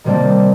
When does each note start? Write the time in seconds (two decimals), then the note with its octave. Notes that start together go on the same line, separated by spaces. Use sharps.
0.04 C3 D#3 G3 A#3 D4